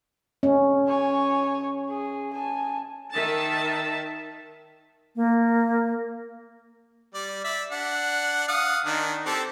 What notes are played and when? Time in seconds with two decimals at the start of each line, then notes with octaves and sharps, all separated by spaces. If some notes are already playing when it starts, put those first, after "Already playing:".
0.43 C#4
0.87 C#5 G#5
1.89 G#4
2.32 G#5 A5
3.12 D#3 E5 A5
5.16 A#3
7.15 G3 D5
7.44 D5 E5
7.72 D4 F#5
8.48 F5 F#5 D#6
8.86 D#3 D4
9.26 C4 G4 A4